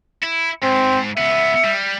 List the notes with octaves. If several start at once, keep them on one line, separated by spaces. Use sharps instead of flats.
E4
G#2 C4
C#2 B3 E5
G3